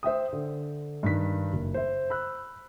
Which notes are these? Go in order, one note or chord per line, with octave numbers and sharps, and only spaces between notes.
C5 E5 G5 D#6
D3
G2 D#3 B6
F#1
C5 E5
B5 E6 F#6